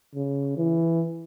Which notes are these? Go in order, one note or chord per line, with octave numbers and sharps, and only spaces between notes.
C#3
E3